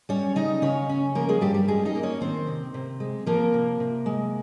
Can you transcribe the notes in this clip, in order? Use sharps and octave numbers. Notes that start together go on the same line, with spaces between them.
G3 C#4 C#5
C#3 D#4 D#5
C#3 C#4 C#5
C#4
F3 A#3 A#4
G#3 G#4
G2 G3 G4
G3 G4
G#3 C#4 G#4
D#4 D#5
A#3
C#4 C#5
D#3 C4 C5
C3
C3
G#3
F3 A#3 A#4
C3
C3
G#3